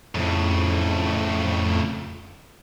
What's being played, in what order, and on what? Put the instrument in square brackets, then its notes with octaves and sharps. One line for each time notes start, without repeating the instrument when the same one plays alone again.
[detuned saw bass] F2 [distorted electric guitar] A2 C#3